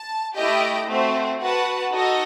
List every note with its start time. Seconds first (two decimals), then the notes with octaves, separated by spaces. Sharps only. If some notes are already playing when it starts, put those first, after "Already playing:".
Already playing: A5
0.34 A3 E4 G4 D#5 G5
0.87 A3 C4 F#4 C5
1.39 F#4 B4 F#5 A5
1.92 D#4 F#4 A4 D#5